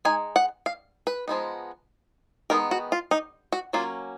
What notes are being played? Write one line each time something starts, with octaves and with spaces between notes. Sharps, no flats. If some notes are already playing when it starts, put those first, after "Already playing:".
G#3 D#4 G#5
F#5
F5
B4
F3 G#3 B3 D#4
D#3 G#3 B3 D#4 A#4
F#4
F4
D#4
F#4
F#3 A#3 C#4 F4